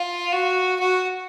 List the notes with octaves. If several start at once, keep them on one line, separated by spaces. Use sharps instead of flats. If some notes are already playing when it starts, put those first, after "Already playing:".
Already playing: F4
F#4
F#4